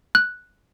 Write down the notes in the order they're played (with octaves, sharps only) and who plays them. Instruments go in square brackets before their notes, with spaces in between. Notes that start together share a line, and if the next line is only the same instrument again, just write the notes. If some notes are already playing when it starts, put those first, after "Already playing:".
[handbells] F#6